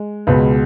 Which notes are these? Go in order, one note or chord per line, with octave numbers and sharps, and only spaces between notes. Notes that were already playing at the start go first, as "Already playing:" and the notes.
Already playing: G#3
C#2 B2 G#3 B4